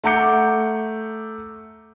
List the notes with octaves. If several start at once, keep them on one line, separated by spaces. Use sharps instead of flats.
A3 F#5 A#5 D6 G6 C#7